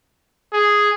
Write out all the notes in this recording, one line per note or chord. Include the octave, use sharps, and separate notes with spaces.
G#4